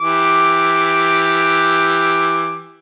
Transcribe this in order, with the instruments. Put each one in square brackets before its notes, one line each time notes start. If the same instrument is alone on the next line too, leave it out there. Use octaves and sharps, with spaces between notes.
[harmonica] E3 G4 D6